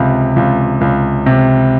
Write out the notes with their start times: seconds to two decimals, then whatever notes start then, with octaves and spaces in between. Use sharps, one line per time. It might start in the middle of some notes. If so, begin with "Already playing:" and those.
Already playing: C#2 C3
0.36 C#2
0.81 C#2
1.26 C3